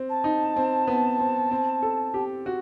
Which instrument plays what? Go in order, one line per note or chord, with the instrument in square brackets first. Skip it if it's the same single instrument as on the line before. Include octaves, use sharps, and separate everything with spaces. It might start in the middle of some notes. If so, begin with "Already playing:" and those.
Already playing: [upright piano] C4
[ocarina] A5
[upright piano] D#4
C4
B3
C4
C4
A4
G4
F#4